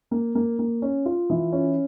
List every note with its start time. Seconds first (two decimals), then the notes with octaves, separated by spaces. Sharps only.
0.11 A#3
0.35 A#3
0.59 A#3
0.82 C#4
1.06 F4
1.30 E3
1.52 C#4